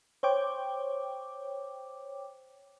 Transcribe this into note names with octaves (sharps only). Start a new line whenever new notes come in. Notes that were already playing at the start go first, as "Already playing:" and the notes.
C5 C#5 G5 D6